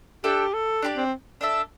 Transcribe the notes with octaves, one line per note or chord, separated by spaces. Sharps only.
D4 G4 A4 E5 G5
A4
D4 G4 D5
C4
D4 A4 E5